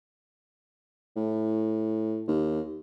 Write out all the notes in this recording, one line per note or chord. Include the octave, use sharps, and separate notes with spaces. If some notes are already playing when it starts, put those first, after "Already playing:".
A2
D#2